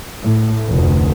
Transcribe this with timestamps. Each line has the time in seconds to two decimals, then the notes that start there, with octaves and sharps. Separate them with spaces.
0.22 A2
0.69 F1 D2